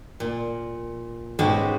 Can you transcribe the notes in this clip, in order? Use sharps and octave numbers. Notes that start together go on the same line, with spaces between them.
A#2
G#2 B2 G#3 C#4 F#4 G4